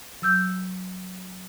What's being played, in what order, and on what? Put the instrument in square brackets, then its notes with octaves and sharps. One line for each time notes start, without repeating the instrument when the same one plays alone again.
[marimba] F#3 E6 G6